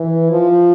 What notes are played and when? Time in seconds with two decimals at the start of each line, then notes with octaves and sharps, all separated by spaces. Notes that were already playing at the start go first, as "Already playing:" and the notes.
Already playing: E3
0.31 F3